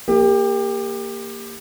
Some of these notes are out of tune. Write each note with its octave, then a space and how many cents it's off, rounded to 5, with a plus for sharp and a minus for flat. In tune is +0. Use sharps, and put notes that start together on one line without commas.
A#3 -10 G4 +25